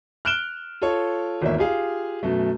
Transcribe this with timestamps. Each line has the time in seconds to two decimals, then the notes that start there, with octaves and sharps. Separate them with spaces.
0.25 F6 F#6 D7 E7 G7
0.82 F4 A4 C#5
1.42 G#1 E2 A#3 C#5 E5
1.58 F4 G4 G#4 F5
2.23 F#2 B2 A3